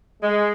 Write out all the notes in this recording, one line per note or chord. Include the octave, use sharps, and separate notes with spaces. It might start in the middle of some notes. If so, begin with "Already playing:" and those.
G#3